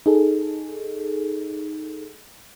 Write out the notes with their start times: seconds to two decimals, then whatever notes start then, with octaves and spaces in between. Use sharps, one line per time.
0.06 D#4 G#4 A4